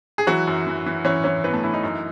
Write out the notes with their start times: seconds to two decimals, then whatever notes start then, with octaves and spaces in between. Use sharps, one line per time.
0.18 G#4
0.27 E3 F#3 F#4
0.47 F#2
0.67 E3
0.86 E3
1.05 E3 C#4 C#5
1.24 E3 C#4 C#5
1.44 E3 B3 B4
1.53 A3 A4
1.63 E3 E4
1.74 D#4
1.83 F#2